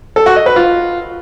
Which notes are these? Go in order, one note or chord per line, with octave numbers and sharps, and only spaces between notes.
A4
F#4
D#5
B4
F4